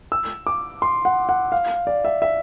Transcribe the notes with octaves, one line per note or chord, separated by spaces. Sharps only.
E6
D6
C6
F#5
F#5
F5
D5
E5
E5